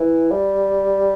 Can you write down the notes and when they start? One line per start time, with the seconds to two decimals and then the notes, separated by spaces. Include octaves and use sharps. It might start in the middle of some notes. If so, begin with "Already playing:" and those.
Already playing: E3
0.31 G3